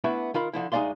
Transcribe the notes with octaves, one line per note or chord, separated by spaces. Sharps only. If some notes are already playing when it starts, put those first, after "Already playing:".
A3 B3 D4 E4
D#3 F4 A#4 B5
D3 F3 E4
D2 G#3 D#4 D5 F5 C6